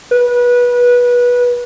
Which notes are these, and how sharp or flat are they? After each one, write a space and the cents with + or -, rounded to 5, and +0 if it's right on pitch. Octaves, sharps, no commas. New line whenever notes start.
B4 -20